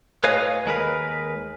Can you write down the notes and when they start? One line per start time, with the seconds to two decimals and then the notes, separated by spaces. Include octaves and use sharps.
0.24 A2 B4 C#5 D#5 F5 G#5
0.66 D#2 G#3 A#4 B4